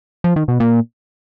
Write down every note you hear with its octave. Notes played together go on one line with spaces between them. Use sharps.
F3
D#3
B2
A#2